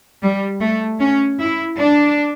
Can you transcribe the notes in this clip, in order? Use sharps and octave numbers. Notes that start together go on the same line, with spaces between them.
G3
A3
C#4
E4
D4